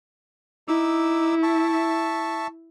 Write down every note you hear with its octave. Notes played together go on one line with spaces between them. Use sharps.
D#4 E4 D6 E6
E5 A5 C#6